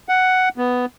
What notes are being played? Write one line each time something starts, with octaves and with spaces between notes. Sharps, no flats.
F#5
B3